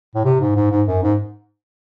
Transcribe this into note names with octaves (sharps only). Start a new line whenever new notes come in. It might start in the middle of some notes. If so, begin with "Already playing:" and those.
A2
C3
G#2
G#2
G#2
F#2
G#2